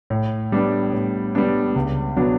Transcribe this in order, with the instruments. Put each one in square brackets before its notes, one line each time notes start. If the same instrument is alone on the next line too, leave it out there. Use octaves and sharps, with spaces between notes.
[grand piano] A2
G3 B3 D4
A2
G3 B3 D4
C#2
B2 F#3 B3 D4